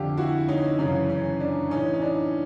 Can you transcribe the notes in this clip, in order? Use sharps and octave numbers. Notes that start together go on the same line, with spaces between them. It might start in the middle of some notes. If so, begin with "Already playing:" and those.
Already playing: F2 D3 F4 G4
E4 F#4
C#4 D#4
F#2 C#3 E3 C#4
C#4
D4
A2 E3 C#4 D#4
D#4
D4